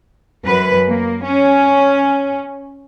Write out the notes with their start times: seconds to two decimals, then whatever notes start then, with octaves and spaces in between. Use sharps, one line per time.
0.43 F#2 B4
0.87 A#3
1.23 C#4